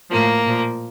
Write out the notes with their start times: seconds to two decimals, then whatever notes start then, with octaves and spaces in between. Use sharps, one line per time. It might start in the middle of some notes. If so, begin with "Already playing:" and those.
0.10 A2 F3 A#3
0.46 A#2 F3